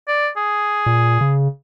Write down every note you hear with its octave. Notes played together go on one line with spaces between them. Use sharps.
D5
G#4
A#2
C#3